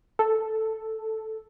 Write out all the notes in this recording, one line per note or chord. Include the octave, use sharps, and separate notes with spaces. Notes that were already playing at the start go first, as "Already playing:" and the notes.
A4